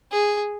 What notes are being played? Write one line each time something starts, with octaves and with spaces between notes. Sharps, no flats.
G#4